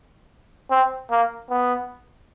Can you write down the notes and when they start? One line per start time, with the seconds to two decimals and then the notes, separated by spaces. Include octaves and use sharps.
0.70 C4
1.10 A#3
1.50 B3